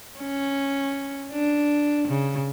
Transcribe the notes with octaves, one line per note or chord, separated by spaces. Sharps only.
C#4
D4
C#3